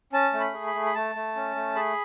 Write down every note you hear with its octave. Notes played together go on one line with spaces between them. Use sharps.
C#4 A5
A3
B5
G#4
B5
A3
B5
A3 A5
A3
C#4
A3
G#4 B5